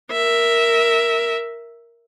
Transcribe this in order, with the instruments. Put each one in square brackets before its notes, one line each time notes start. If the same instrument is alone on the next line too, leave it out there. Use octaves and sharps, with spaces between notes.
[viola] A#4 E5